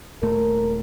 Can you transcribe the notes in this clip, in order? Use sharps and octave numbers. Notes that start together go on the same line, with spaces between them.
D#1 A#2 A3 A#4